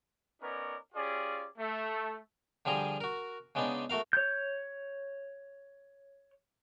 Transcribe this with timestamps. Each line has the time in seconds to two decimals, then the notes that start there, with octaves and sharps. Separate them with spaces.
0.41 B3 C#4 D#4 A#4 C#5 D5
0.95 C#4 F4 G4 G#4 D5
1.58 A3
2.65 D3 F3 G3 G#4 A#5
3.01 F#4 A#4
3.55 C#3 G#3 B3 D4 D#4
3.90 A3 F#4 A#4 F5
4.13 C#5 G6